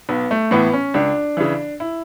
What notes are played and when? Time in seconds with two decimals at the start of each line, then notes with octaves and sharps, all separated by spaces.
0.09 B1 B3
0.31 A3
0.51 A2 E3 B3
0.73 C#4
0.94 C#2 D4
1.37 C#3 E3
1.80 E4